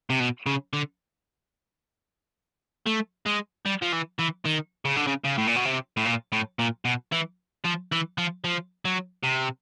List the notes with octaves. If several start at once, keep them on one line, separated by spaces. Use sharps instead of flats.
C3
B2
C#3
D3
A3
G#3
G3
F3
E3
E3
D#3
C#3
D3
C#3
C#3
A2
A#2
B2
C3
A2
A#2
A2
A#2
B2
E3
F3
E3
F3
F3
F#3
C3